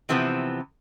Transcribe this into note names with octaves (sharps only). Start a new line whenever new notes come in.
C3 E3 F3 B3 C4